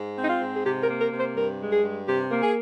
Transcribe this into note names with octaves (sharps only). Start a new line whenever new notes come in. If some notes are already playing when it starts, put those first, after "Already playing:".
Already playing: G#2
C4
D#4
F4
G#2
G#4
C3 G4
A#4
A#3
A#4
C3
C5
G2 A#4
G#3
G#4
G2
C3 G4
A#3
G#4